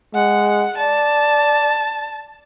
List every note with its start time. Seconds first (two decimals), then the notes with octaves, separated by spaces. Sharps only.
0.14 G#3 F#5
0.77 D5 A5